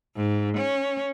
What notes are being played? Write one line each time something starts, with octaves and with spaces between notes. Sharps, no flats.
G#2
C#4